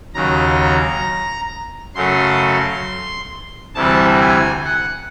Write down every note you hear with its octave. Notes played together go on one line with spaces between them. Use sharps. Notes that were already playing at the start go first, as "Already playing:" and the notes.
D#2 C#3 F#3 A#5
F#2 C#3 F#3 A3 C#4 C6
D2 C3 E3 G3 A5
G#5
F#5